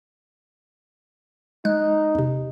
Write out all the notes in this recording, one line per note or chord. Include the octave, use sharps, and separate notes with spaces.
G#3 D#4 F#6
E2 C3